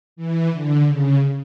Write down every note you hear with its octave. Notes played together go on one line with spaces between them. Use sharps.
E3
D3
C#3